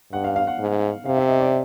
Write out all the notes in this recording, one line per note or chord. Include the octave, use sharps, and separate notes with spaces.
G2 F#5
F5
F5
F#5
G#2
C3 F5
E5
D#5
D5